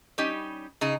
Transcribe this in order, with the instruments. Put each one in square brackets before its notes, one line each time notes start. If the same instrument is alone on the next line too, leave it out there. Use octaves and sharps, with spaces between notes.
[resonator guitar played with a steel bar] G3 C#4 D#4 G4
C#3 D#4 G#4